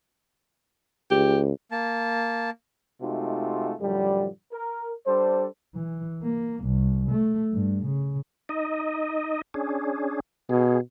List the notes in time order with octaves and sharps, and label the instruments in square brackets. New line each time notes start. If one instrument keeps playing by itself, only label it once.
[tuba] C#2 [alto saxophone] G4
[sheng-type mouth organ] A#3 A5
[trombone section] C3 G#3 A3 D#4 F4 F#4
F#2 A2 D3 F3 G3
A#4
G3 D4 A4 C5
[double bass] E3
A#3
C2
A3
G2
C#3
[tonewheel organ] D#4 D#5
C#4 D4 G#4
[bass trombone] B2 [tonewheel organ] G#4